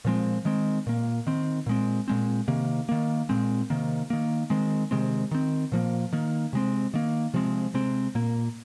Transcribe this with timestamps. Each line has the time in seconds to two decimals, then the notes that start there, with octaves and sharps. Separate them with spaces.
0.05 A#2 F3 G#3 C4
0.45 D#3 G#3 C4
0.87 A#2 A#3
1.27 D#3 C4
1.66 A#2 G#3 C4
2.08 A#2 G#3 C4
2.48 C3 D#3 A#3
2.89 D#3 A#3
3.29 A#2 G#3 C4
3.70 C3 D#3 A#3
4.10 D#3 A#3
4.50 D#3 G#3 C4
4.91 C3 D#3 G#3 C4
5.31 D#3 C4
5.72 A#2 F3 A#3
6.12 D#3 A#3
6.53 C3 G#3 C4
6.94 D#3 A#3
7.34 C3 F3 G#3 C4
7.74 C3 G#3 C4
8.15 A#2 A#3